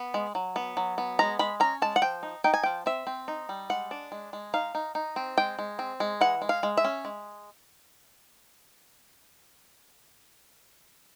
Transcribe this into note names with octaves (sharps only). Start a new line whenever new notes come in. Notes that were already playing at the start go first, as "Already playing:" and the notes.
Already playing: B3
G#3
F#3
B3
F#3
B3
G#3 A#5
G#3 B5
C#4 A#5
G#3 A5
F#5
F3 G5
D#4
D#4 G5
G#5
F3 G5
C4 E5
C4
D#4
G3
G#3 F#5
D4
G#3
G#3
D#4 F5
D#4
D#4
C4
G#3 G5
G#3
C4
G#3
E3 F#5
G#3
F5
G#3
E5
C#4
G#3